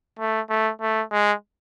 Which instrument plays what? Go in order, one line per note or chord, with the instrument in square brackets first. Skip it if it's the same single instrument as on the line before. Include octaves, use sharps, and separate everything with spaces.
[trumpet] A3
A3
A3
G#3